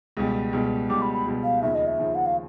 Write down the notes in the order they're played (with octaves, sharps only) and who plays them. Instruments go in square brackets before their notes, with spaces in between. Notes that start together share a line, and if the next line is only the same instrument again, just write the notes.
[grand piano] C#2 B2 G3
C#2 B2 G3
[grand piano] C#2 B2 G3 [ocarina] D6
[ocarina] B5
B5
[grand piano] C#2 B2 G3
[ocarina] F5
[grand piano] D#2 C#3 F3 [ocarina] E5
[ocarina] D#5
E5
[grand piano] D#2 C#3 F3
[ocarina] F#5
F5